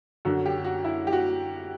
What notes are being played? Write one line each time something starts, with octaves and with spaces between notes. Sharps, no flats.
F#2 D3 F#4
G4
F#4
E4
G4
F#4